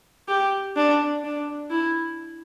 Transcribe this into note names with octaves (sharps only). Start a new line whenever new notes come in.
G4
D4
D4
E4